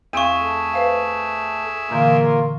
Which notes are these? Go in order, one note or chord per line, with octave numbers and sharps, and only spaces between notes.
E2 C4 G#4 E5 F5 C#6 D#7
A3
B4 C5 F5
A#2 D3 E3 A#3 F4 A#4